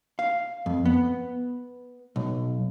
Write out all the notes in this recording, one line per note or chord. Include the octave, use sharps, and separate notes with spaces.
F5
F2
B3
B1